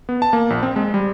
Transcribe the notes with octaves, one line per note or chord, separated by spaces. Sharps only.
B3
A5
A#3
A#1
C4
G#3
G3